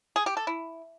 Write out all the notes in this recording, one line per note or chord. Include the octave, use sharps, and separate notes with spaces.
G#4
G4
A4
E4